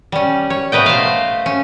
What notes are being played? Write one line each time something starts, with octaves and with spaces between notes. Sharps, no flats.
G3 C#4
C#5
B2 A3 B4 D#5 G5
C5 F5
C#4